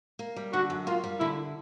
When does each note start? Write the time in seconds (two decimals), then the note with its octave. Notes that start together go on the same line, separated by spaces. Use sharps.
0.19 A#3
0.36 G3
0.53 D3 F#4
0.70 F#2
0.87 A#3 F4
1.04 G3
1.20 D3 E4